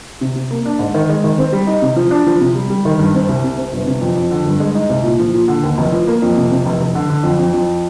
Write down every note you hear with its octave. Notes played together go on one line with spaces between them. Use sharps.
C3
C3
A#3
D4
G#2
D#3
G#3
D#3
C4
G3
D#4
C3
F3
D4
F3
C3
G3
G3
D#3
G2
C4
C2
C3
C4
G1
C3
F2
F2
D3
G2
G#3
D#4
C2
A#2
F3
A#2
D3
D#2
F1
F3
A#3
F2
C3
C3
F1
F1
D3
D3
F2
F2
F2